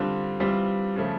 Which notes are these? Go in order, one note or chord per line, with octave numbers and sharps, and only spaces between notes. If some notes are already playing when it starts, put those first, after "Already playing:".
Already playing: D3 G3 C4 F4
E3 G3 C4 F4
C#3 F3 A3